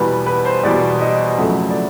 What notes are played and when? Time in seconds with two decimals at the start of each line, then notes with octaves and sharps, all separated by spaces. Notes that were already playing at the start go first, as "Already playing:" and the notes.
Already playing: E2 B2 G3 B4
0.26 B4
0.45 C5
0.63 E2 B2 G3 D5
1.01 D#5
1.38 F2 C#3 F#3 A3 E5
1.70 D5